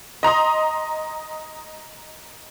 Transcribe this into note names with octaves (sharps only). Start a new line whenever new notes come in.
D#5 A#5 C6 D#6